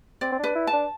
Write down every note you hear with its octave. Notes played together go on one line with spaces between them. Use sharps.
C4 D5
C4
D4 B4
E4
A5
D4